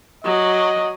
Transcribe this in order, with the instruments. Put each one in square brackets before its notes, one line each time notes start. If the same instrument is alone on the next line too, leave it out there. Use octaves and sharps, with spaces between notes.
[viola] F#3 [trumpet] D#5